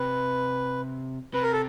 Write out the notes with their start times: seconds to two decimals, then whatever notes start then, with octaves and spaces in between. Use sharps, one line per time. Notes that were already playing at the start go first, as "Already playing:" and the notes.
Already playing: C3 B4
1.34 C3 B4
1.43 A#4
1.52 A4